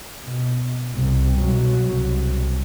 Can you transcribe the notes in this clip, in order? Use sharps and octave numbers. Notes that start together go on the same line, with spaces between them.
B2
C2
B2 F#3
C2